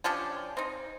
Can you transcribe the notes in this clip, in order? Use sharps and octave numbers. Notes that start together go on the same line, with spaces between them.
F3 C#4 D4 G4
C4 D#4